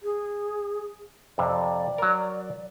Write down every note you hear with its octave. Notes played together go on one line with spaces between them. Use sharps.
G#4
F2 C3 D5
F#3 A#4